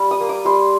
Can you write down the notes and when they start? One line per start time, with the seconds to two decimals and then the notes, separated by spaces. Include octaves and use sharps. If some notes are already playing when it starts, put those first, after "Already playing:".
Already playing: G3
0.11 D#6
0.20 A#3
0.29 D6
0.45 G3 C6